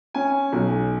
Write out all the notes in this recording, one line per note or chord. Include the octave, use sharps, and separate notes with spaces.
C#4 G#5
B1